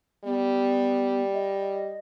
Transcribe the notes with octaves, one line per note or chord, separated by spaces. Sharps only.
G3 B3
D#5